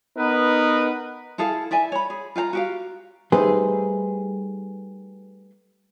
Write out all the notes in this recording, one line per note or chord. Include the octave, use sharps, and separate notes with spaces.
B3 D#4 A#4 B4
E4 G#4 A4 F5
E4 D5 E5 G#5
C#5 B5
G#4
F4 F5 F#5 A#5
F#4 G4 F5
G3 A3 D#4 G#4 B4 C5